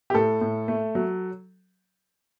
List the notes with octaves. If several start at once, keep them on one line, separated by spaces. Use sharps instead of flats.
G4
A2 A4
A2
A3
F#3